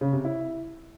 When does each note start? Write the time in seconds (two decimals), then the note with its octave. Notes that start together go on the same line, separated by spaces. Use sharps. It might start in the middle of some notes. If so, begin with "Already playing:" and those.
0.01 C#3
0.13 C3
0.25 E4